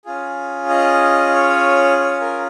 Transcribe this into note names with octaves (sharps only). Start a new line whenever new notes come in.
C#4 F4 G#4
D#5
C#5
C#5
A#4